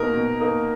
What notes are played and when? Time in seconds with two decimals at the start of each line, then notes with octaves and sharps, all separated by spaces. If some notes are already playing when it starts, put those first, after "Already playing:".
Already playing: B2 A#3 D#4 A#4
0.14 B2
0.40 A#3 D#4